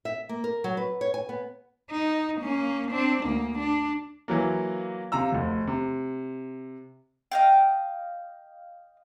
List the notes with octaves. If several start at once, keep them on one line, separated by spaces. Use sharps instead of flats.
E5
A#3
A#4
F#3
B4
C#5
G#5
B3
D#4
A#3 C#4
C4 D4
D2 A#3
D4
E3 F#3 A#3
C3 F4 A#5 E6
F1 D2
C3
D#5 F5 G5